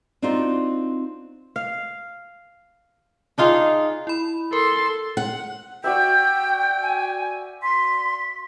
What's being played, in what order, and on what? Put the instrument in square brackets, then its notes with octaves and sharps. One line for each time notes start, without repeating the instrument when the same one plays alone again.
[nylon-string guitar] C4 D4 D#4 F4 F#4 C5
[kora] F5
D4 D#4 F4 G#4
[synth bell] E4 B5
[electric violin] A4 C6 [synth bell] A#4
[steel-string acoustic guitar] F#5
[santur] F#4 D5 E5 [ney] G5 [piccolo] G6
[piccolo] G#5
[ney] C6 [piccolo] B6